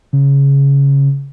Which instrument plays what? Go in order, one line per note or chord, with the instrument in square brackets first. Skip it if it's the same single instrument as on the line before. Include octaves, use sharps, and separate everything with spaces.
[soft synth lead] C#3